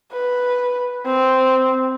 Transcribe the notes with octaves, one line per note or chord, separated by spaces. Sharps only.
B4
C4